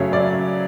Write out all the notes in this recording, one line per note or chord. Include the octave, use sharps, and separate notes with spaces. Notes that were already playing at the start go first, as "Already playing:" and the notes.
Already playing: F#2 C#3 F#3 A3 C#5
F#2 D5